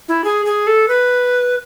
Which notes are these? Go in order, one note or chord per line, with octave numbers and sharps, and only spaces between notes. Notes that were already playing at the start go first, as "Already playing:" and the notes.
E4
G#4
G#4
A4
B4